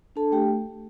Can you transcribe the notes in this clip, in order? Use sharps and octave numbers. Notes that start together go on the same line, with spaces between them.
D4 A4 A5
A3 G4 G5